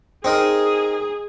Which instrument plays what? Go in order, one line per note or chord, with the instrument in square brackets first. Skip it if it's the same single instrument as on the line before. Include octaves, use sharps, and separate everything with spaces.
[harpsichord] C4 D#4 A#4 [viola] G#4